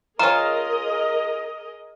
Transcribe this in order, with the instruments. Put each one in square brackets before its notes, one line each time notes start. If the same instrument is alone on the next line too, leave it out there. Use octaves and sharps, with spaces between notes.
[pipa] C#4 F4 [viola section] G#4 A#4 D#5 [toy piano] A#5